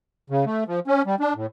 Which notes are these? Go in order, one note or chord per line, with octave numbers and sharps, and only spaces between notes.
C#3
A3
F3
C#4
G3
D4
A2